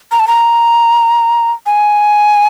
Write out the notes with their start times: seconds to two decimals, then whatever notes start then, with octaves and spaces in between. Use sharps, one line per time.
0.12 A#5
0.20 A5
0.28 A#5
1.66 G#5